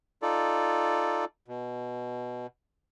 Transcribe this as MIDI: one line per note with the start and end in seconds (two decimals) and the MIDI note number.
0.22 1.25 63
0.22 1.25 65
0.22 1.25 69
0.22 1.25 74
1.48 2.47 47